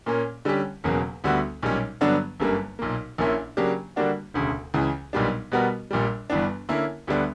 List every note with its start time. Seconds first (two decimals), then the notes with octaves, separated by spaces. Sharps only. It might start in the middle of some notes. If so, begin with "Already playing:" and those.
0.06 A#2 A#3 C#4
0.45 D3 G3 C#4 G4
0.84 E1 E2 C#3 F#3 A#3
1.24 D2 D3 G3 B3 F#4
1.63 B1 A#2 G3 C#4
2.01 G2 D3 F#3 B3 D4
2.40 G1 F#2 D3 G3 A#3
2.79 B1 A#2 A#3
3.18 A#1 A#2 A#3 C#4 E4
3.57 C#3 F#3 A#3 D4 G4
3.96 D3 G3 A#3 D4 F#4
4.34 E1 D2 C#3
4.74 C#2 C#3 E3
5.13 B1 A#2 G3 B3 D4
5.52 B2 G3 B3 F#4 A#4
5.91 A#1 A#2 G3
6.30 G1 G2 E3 B3 D4
6.69 D3 A#3 C#4 E4 A#4
7.07 D2 D3 G3 B3 D4